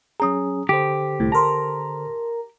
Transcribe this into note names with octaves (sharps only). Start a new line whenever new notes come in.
F#3 C#4 G#4 A#5 D#6
D3 G4 A4 C5
C2 A2
A#4 A5 A#5 C6